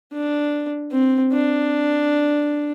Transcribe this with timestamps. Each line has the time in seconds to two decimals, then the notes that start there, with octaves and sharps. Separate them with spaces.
0.13 D4
0.92 C4
1.32 D4